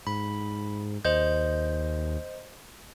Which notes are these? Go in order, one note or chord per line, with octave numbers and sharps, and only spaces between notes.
G#2 B5
D#2 C5 D#5 G6